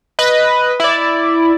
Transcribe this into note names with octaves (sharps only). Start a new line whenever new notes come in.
B4 D#5
E4 D5